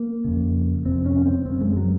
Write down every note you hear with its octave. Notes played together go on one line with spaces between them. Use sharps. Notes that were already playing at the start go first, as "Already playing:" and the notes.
Already playing: A#3
F2 C#3
F2 C3 C4
C#4
C4
F#2 C#3 C4
G#3
F#3